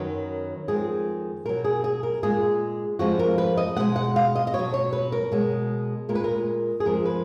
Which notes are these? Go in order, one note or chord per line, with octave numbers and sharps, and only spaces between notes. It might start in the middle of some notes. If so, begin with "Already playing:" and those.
Already playing: F#2 D#3 F#3 B4
F2 D#3 G#3 G#4
B2 F#3 A#4
G#4
G#4
A#4
A#2 G#3 G#4
F2 F3 G#3 F#4
A#4
B4
D#5
B2 G#3 F#5
F#5
F5
D#5
D#5
B2 C#5
F#3
C#5
B4
A#4
B2 G#3
A#2 G#3 A#4
B4
A#4
G#4
F2 F3 G#3 A#4
B4